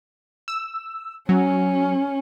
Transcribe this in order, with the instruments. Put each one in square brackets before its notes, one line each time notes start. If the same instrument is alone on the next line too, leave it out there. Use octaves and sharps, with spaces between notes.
[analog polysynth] E6
[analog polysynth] F#3 [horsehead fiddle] C#4